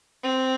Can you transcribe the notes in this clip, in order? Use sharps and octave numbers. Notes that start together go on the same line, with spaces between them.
C4